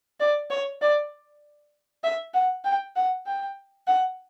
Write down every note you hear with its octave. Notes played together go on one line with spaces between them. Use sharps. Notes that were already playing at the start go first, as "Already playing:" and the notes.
D5
C#5
D5
E5
F#5
G5
F#5
G5
F#5